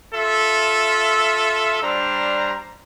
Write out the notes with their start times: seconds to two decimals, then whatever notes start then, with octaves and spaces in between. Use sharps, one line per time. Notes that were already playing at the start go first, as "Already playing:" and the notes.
0.13 F4 A4 E5
1.82 G3 D4 C5 A#5